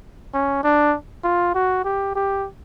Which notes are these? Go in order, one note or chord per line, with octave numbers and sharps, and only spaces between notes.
C#4
D4
F4
F#4
G4
G4